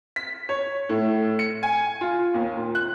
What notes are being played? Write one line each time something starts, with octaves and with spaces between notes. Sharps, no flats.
B6
C#5
A2
C#7
G#5
F4
D#2
A#2
F#6